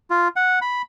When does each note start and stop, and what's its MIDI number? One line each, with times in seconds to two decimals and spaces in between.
0.10 0.28 65
0.36 0.59 78
0.62 0.82 83